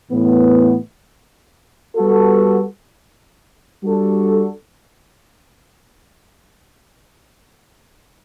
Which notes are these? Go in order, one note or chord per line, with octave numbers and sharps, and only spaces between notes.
A2 E3 B3
G3 B3 F#4 A4
G3 D4 F#4 A4